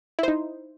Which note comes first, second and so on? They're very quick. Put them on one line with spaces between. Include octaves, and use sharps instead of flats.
E4 C5 D#4